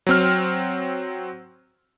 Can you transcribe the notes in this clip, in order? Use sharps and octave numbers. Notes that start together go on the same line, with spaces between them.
F#3 C4 F6